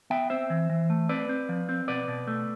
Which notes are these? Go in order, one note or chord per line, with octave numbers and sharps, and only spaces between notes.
B3 E5 G5
C4 C5 E5
E3
E3
A3
C4 B4 D5
C4
F3
C4
B2 B4 D5
B2
A3